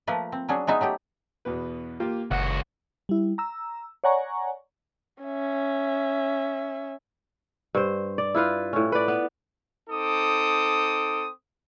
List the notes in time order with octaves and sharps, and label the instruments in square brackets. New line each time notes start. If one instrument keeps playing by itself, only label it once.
[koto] F3 A3 A#3 B4
C4
F#3 C#4 D4 G#4
G#3 B3 D#4 B4 E5
F#3 A3 G4
[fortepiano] E2 B2 B4
A#3 F4 G4
[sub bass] F#1 [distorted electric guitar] C#2 F#4 [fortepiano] F#5
[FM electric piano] G3 E4
A#5 E6
C#5 D5 F#5 G#5 A#5 C#6
[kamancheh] C#4 E5
[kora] G2 C5
D5
E4 F4 B4 F5
A2 C#4
B4 D5
B3
[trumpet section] C4 D#4 A4 D6 D#6